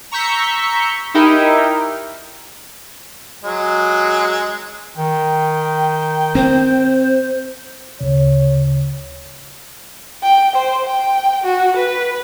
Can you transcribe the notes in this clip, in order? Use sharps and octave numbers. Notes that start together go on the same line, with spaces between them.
A#5 C#6 E6 G6 B6 C#7
D#4 E4 G4 A#4 G5
F#3 G#3
D#3 G5
C4 C5
D2 C#3 C#5
G5
C5
G5
F#4
B4